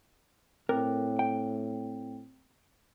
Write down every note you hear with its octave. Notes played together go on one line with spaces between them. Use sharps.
A2 C4 A#4
G5